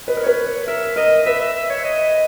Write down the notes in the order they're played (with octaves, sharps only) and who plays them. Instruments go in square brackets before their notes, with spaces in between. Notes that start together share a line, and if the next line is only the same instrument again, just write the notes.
[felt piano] B4 [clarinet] D#5
[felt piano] A#4
[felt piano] B4 [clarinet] C#5
[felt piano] A#4 [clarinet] E5
[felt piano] A#4 [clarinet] D#5
[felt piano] B4 [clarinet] E5
[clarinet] E5
E5
C#5
D#5